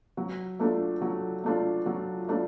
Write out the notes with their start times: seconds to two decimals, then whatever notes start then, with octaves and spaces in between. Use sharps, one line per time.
0.17 F#3
0.59 A3 D4 F4
1.01 F#3
1.44 A3 D4 F4
1.86 F#3
2.28 A3 D4 F4